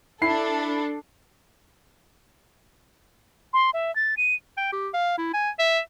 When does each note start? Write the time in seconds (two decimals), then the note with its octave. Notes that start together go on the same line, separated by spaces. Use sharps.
0.22 D4 E4 A4 B5 C7
3.53 C6
3.74 E5
3.96 A6
4.17 D#7
4.57 G5
4.72 G4
4.94 F5
5.18 E4
5.34 G#5
5.59 E5